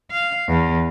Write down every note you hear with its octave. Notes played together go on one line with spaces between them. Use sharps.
F5
E2